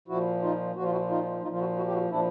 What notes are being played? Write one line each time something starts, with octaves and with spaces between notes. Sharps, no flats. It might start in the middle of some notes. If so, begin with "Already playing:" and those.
A#2 F3 E4 F#4
D#4 F4
A#2 F3 F#4
F4
E4 F#4
D#4 F4
A#2 F3 D#4 F4
F4
E4 F#4
E4 F#4
G4
E4 F#4
A#2 F3 D4 E4